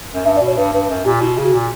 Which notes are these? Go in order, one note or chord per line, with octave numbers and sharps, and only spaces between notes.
F#2
G2 E5
D5
B2
C#5
G2 B4
G2 B4
F#2
A#2 G4
B2 E4
F#4
C#3
F#4
A#2